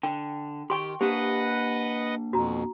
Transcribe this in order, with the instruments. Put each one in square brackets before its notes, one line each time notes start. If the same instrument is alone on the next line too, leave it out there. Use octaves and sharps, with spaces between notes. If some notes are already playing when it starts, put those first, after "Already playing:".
[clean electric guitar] D3 [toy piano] G5
[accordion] D#3 [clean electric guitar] G4 G5 [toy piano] C6 C#6
[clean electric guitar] A#3 D4 [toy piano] G4 [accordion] B4 D#5 F#5
[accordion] F2 B2 [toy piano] F#4 A#5